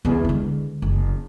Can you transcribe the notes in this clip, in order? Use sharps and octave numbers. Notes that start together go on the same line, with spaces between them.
E2 D3
D3 G#3
F#1